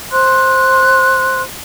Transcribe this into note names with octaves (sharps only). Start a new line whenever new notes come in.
C5 C6 F#6